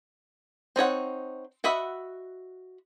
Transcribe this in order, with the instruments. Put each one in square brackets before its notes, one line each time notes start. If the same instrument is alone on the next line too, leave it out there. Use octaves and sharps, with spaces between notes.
[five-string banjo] C4 D#4 C#5 F#5
F#4 D#5 E5 F#5 B5